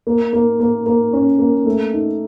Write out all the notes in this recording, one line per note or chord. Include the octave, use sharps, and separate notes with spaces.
A#3
A#3
A#3
A#3
C#4
A#3
A3
D#4